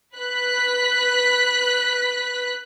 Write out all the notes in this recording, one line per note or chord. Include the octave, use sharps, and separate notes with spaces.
B4 F#6 B6